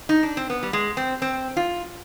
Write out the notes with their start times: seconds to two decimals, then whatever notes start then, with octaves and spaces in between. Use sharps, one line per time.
0.09 D#4
0.23 D4
0.37 C4
0.50 B3
0.63 G3
0.73 G#3
0.97 C4
1.22 C4
1.57 F4